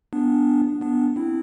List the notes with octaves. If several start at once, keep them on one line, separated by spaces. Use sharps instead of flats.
B3 D4
B3 D4
C4 E4